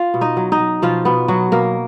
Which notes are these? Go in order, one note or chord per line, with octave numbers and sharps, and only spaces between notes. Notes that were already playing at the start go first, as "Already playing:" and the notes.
Already playing: F4 F5
B2
D#4 D#5
F#3
D#4 D#5
F#3
B2 F3 F4
B2 B3
B2 F#3 F#4
B2 A#3 A#4